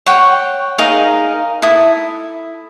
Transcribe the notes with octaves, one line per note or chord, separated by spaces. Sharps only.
C#5 F#5 G5
D#4 G#4 A#4 F5
E4 A4 D#6